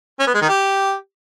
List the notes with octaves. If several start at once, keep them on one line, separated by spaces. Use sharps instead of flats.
C#4
B3
G#3
D#3
G4